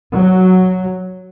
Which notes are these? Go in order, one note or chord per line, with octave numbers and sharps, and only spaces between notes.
F#3